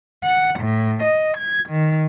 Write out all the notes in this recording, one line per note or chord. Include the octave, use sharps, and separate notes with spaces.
F#5
A2
D#5
G#6
D#3